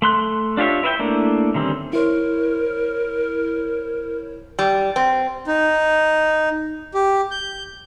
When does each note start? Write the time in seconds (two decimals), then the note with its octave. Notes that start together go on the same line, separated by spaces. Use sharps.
0.02 A3 C6 F#6
0.57 D4 F4 G4 C#5 E5
0.83 E4 B4 E5 F5 G5
0.99 A3 A#3 D4 E4
1.54 D3 D#3 G3 C4 C#4
1.93 E4 A#4 C5 C#5
4.59 G3
4.96 C4
5.47 D#4
6.94 G4
7.31 G6